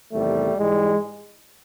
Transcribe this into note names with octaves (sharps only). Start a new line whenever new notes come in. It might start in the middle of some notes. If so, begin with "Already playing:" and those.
E2 C3 D#3 G3 A3
G#2 E3 G3 G#3